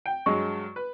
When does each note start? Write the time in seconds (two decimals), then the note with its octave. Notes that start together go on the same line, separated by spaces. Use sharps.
0.06 G5
0.26 G2 F#3 G#3 C#6
0.76 B4